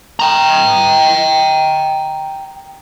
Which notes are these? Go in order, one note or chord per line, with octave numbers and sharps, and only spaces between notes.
G5 A#5